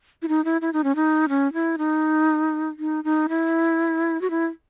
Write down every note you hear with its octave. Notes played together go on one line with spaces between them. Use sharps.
E4
D#4
E4
E4
D#4
C#4
D#4
C#4
E4
D#4
D#4
D#4
E4
F#4
E4